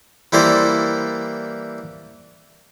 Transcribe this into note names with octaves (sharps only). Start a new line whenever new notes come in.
E3 G3 A#3 E4 C5 D5